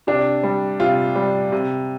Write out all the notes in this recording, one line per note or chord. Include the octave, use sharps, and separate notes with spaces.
C3 D4
G3
C3 F4
G3
C3